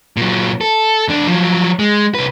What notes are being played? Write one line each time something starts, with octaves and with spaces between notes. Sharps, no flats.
A#2 F#3
A4
E2 D4
F3 F#3
G#3
C2 B4